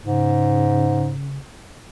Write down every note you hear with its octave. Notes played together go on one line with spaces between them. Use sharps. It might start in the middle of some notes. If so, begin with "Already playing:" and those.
G#2 C#3